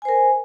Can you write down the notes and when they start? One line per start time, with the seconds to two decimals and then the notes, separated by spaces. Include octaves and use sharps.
0.02 G#5
0.05 C5
0.09 A#4